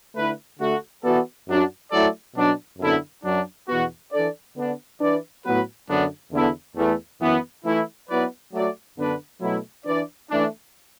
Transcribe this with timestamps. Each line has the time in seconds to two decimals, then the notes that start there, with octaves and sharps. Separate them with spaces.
0.15 D3 A3 E4 B4
0.59 D3 A3 F#4 A4
1.03 E3 B3 F#4 A4 D5
1.47 F#2 F#3 D4 F#4
1.91 F#3 A3 E4 A4 D5
2.35 B2 F#3 D4
2.79 F#2 D3 B3 E4 A4
3.24 F#2 F#3 D4
3.68 E2 B2 B3 F#4
4.12 E3 D4 A4 D5
4.56 D3 B3 D4
5.00 E3 D4 B4 D5
5.44 A2 F#3 B3 F#4 B4
5.88 F#2 D3 F#3 B3 D4
6.32 E2 D3 B3 E4 A4
6.76 E2 E3 A3
7.21 F#2 E3 B3
7.65 E3 A3 E4
8.09 F#3 B3 E4 B4 D5
8.53 F#3 A3 F#4 D5
8.97 F#2 D3 B3 D4 B4
9.41 B2 F#3 A3 E4
9.85 E3 D4 B4 D5
10.29 E3 A3 D4